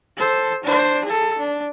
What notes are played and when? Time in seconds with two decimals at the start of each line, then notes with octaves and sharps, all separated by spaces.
0.17 A4 C5
0.63 D4 C5
1.05 G#4 A4
1.38 D4